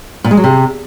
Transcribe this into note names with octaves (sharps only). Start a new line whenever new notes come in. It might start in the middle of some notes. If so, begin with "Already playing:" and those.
A#2
G#3
F#3
C3